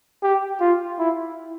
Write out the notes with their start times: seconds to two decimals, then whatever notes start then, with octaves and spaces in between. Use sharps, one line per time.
0.23 G4
0.60 F4
0.98 E4